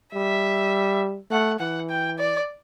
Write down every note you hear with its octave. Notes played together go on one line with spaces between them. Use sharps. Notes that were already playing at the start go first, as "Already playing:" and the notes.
G3 E5
A3 F#5
E3 F#5
G5
D5